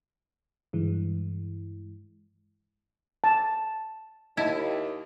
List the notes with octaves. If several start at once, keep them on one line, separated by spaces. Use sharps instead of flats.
G2 E3 G#3
A5
D#2 E4 D#5 A5 G#6